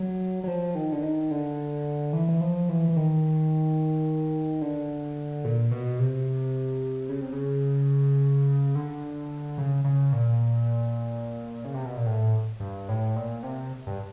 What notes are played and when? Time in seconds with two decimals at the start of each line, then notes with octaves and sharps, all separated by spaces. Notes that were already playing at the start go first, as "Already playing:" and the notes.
Already playing: F#3
0.44 F#3
0.48 F3
0.75 D#3
0.92 D3
1.02 D#3
1.31 D3
2.13 E3
2.28 E3
2.41 F3
2.69 E3
2.89 E3
2.96 D#3
4.61 D3
5.45 A#2
5.71 B2
5.99 C3
7.09 C#3
7.21 C3
7.33 C#3
8.75 D3
9.58 C#3
9.84 C#3
10.13 A#2
11.65 C#3
11.74 C3
11.85 B2
11.96 A#2
12.06 A2
12.60 G2
12.89 A2
13.16 A#2
13.43 C3
13.87 G2